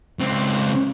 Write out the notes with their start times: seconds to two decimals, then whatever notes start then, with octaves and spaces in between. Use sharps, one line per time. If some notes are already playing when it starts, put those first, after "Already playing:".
0.19 C#2 C4